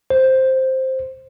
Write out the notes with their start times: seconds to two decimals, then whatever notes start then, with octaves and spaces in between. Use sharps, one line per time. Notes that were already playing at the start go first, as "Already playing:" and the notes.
0.10 C5